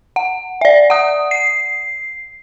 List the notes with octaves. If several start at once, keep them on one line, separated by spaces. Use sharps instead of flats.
F#5
D5 E5
F#5 D#6
C7